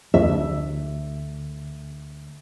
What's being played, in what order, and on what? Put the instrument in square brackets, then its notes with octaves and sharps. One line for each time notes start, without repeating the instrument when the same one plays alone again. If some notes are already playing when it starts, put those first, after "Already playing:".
[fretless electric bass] D2 [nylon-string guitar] E5